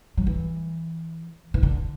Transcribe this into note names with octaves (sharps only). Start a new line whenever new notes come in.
F#3
E3
E3
D3